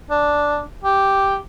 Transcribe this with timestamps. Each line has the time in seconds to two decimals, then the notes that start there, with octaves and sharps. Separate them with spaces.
0.10 D4
0.84 G4